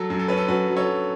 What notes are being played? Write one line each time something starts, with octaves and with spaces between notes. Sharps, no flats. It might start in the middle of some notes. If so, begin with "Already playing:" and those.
Already playing: F#3 A4
F#2
A4
C#4 B4
A4
F#2 F#4 B4
F#3
A4 C#5
F#3